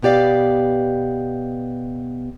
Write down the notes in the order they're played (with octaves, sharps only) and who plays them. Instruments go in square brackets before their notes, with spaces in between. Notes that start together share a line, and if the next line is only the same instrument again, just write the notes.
[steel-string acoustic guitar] B2 B3 G4 D5 F5